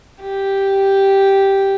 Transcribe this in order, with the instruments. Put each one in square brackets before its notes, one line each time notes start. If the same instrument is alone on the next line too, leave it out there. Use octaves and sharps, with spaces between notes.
[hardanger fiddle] G4